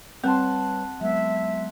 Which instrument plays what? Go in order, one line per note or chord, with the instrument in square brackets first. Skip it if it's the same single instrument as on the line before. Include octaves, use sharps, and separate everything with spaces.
[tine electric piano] G3 B4 C#5 [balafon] C4 [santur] F#5 A5 C6
[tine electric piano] F#3 G#3 B3 [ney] E5